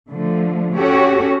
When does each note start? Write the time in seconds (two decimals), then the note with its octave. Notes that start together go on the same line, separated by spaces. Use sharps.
0.11 D3 F3 A3
0.76 C#4 F#4 G4 A4 C#5